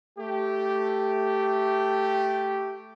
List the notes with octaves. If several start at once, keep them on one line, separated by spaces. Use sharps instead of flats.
A3 G4